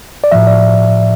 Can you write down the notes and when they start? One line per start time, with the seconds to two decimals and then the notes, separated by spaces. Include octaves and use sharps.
0.24 D5
0.32 A2 F3 E5
0.47 D5